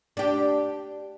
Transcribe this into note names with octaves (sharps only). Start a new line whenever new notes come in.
D4 G4